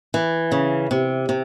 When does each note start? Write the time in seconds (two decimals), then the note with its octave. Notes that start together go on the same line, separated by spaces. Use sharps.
0.14 E3
0.52 C#3
0.91 C3
1.29 C3